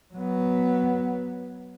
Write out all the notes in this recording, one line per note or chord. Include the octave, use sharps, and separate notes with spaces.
F#3 B3